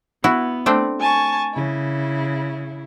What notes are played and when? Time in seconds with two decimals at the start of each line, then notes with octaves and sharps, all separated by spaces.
0.24 B3 E4 F#4
0.66 A3 C4 D4
0.99 G#5 A5 C#6
1.53 C#3 E4